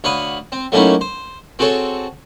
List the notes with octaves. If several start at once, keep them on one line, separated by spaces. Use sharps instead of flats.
D2 C#5 F5 F#5 B5 D#6
C4
F#3 A3 A#3 C#4 D#4 E4
C5
C4 F#4 G#4 A4 C#5